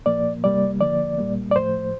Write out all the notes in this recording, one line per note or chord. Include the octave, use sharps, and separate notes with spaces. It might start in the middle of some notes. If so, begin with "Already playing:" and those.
A#2 F3 A#3 D5
C3 G3 A#3 D5
D3 F3 A#3 D5
A#2 G3 A#3
D5
A2 F3 A3 C5